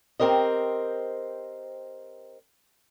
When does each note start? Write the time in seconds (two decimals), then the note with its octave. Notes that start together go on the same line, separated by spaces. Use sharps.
0.20 C4 G4 A#4 C5 D#5